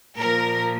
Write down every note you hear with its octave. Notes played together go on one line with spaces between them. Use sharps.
A#2 F3 A#4